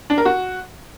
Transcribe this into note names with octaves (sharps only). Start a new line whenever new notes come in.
D4
A#4
F#4